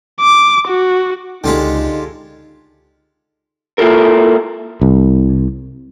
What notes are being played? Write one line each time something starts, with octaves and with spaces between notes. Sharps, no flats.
D6
F#4
C#2 D3 G#3 D#4 F4 G4 A4 G5
A#3 E4 F4 A4 A#4
C2